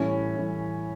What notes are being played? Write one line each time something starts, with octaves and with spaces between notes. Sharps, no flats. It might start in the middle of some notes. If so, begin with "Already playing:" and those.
Already playing: A2 E3 G3 C#4
A2 E3 G3